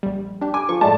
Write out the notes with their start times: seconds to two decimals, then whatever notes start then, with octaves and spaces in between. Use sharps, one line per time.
0.03 A#1 G3
0.41 D4 G4
0.54 G#5 D6
0.69 F3 C#6
0.81 A2 G#3 D5 A5